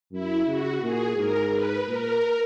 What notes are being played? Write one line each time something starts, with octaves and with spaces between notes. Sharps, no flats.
F#2 E4
C#3 F#4
A#2 G#4
G#2 A#4
B4
A#2 A#4